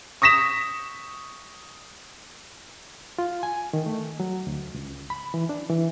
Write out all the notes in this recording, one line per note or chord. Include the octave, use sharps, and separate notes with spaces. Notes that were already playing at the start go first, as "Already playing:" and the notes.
C#6 D#6 A#6 B6 E7
F4
G#5
D#3
A3
F#3
D2
C#2
B5
E3
D4
E3